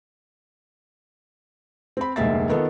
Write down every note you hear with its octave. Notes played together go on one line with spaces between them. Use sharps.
C4 B5
F1 D2 G#3 A#3 E5 A6
D#3 B3 F4 A4